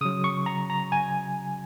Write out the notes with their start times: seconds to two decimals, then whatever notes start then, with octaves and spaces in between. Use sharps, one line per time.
0.01 C#3 F#3 D#6
0.24 C#6
0.46 A#5
0.70 A#5
0.92 G#5